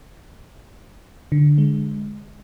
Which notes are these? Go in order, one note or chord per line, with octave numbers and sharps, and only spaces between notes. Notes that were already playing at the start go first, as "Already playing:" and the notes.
D3
G#3